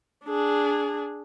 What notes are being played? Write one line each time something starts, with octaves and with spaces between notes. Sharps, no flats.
D4 G#4